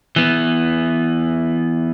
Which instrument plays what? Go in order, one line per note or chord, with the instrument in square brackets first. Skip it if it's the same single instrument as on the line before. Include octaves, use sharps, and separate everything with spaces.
[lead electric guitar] E3 B3